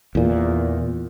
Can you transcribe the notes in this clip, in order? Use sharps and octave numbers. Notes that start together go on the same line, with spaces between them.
E2 A#2